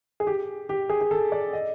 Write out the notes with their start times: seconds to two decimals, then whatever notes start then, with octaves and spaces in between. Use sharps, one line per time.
0.20 G#4
0.27 G4
0.69 G4
0.90 G#4
1.01 G#4
1.11 A4
1.32 D5
1.53 D#5